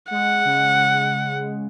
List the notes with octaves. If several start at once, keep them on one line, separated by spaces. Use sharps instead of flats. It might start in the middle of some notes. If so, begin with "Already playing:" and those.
G#3 F#5
C#3
C#3